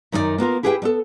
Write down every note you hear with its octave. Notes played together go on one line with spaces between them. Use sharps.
F#2 D#3 D#4 F4 D5
A#3 B3 F4 A#4
E4 G4 G#4 B4 F5 G5
G3 B3 A4